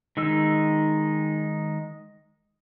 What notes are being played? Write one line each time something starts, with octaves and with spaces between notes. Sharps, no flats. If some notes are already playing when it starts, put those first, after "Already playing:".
D#3 G#3 D#4 E6